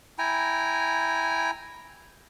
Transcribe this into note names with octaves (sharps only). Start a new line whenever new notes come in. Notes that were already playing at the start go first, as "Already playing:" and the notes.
E4 G5 G#5 A#5